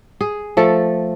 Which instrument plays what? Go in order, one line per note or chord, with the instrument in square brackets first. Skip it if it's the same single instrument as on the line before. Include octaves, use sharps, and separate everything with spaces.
[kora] G#4
F3 A3 A4